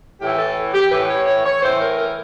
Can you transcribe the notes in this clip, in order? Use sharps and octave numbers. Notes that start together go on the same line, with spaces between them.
A2 E3 G4
A4
G4
A2 E3 B4
C#5
C#5
C#5
A2 E3 C5
A#4
A#4